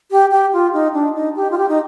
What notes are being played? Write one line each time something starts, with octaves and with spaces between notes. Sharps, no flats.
G4
G4
F4
D#4
D4
D#4
G4
F4
G4
D#4